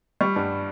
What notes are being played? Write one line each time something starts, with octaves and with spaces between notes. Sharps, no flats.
G3 C#6
G2